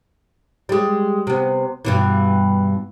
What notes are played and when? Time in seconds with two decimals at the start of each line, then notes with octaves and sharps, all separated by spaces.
0.69 G3 G#3
1.27 C3 B3
1.85 G2 B2 E3